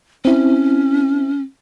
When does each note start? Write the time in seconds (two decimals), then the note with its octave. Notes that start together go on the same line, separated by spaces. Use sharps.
0.25 C4 C#4 E4